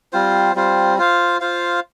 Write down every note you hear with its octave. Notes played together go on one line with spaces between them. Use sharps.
G3 C4 F4 C5
G3 C4 F4 C5
F4 C5 F5
F4 C5 F5